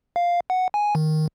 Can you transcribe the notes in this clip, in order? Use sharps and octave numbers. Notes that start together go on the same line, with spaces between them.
F5
F#5
G#5
D#3